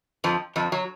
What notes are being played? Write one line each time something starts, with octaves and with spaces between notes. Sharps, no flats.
F2 F3
F2 F3
F#3